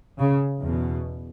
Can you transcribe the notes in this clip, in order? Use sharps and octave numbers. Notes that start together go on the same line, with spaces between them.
C#3
E2 B2